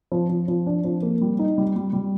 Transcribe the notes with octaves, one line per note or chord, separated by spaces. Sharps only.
F3
F3
F3
D4
F3
A#3
G3
D#4
G3
G3
G3